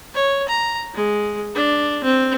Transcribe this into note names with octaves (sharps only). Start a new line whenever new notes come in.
C#5
A#5
G#3
D4
C4